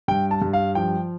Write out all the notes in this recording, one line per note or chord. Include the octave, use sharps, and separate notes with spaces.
G2 G5
A5
G2
F5
F3 G5